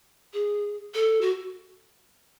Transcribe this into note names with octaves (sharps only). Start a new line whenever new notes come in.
G#4
A4
F#4